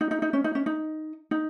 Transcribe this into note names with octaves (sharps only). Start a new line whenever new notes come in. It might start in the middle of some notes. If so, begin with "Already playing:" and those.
D#4
D#4
D#4
C#4
D#4
C#4
D#4
D#4